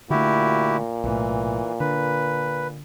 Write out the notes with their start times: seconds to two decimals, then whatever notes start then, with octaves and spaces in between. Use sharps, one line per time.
0.10 A#2 D3 A3 E4 F#4 G4
1.04 B1 A2 E3
1.80 D3 B4